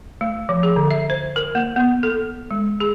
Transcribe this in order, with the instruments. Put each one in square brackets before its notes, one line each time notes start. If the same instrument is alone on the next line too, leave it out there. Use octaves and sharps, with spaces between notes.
[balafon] A3
F3
G#4
D3
E5
C5
A#4
A#3
B3
A4
G#3
G#4